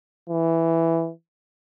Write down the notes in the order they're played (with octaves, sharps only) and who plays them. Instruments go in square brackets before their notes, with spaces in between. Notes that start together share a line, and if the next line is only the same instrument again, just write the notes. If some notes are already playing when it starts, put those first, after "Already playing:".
[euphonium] E3